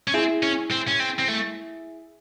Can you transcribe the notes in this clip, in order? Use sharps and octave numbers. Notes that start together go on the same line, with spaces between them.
C#4
C4 E4 G#4
C#4
C4
C#4
C4
C4
A3